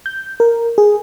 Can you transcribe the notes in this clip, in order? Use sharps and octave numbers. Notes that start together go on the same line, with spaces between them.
G6
A#4
G#4